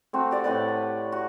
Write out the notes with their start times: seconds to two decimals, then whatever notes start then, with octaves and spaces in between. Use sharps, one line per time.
0.13 A3 C4 F#4
0.31 G4 D5 F#5
0.44 A2 C3 B4 D5
0.68 B5
1.12 F#4